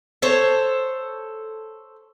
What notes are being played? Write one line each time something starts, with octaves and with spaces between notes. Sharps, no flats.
A4 C5 C#5